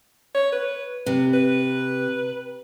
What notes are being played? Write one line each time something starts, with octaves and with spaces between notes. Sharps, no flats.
C#5
B4
C3 B4
B4